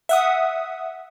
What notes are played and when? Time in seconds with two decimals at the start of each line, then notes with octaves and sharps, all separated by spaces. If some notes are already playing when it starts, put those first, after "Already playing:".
0.09 E5 F#5 D#6